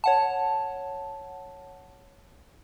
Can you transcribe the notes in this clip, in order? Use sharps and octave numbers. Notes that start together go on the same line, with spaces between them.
C#5 F#5 A5